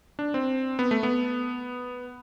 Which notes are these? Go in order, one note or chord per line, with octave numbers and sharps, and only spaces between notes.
D4
C4
B3
A3
B3